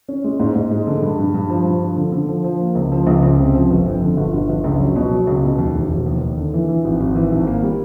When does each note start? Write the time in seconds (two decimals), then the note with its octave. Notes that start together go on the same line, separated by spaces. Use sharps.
0.09 C#4
0.24 G#3
0.40 G#2
0.56 G#2
0.71 G#3
0.87 D3
1.02 G2
1.19 G2
1.34 G2
1.50 F3
1.65 G2
1.82 F3
1.97 D3
2.12 D3
2.28 F3
2.44 F3
2.60 A#3
2.75 C#2
2.92 F3
3.07 C#2
3.23 C#2
3.38 C3
3.54 F3
3.70 G1
3.86 F2
4.01 D3
4.17 G1
4.33 G1
4.49 G1
4.64 C#2
4.80 F#3
4.96 B2
5.11 F#3
5.27 C#2
5.43 B2
5.59 D#2
5.75 E1
5.90 E1
6.06 D#2
6.21 D#2
6.37 D3
6.54 E3
6.69 E3
6.85 G#1
7.00 G#1
7.15 E3
7.32 G#1
7.47 A#3
7.63 G3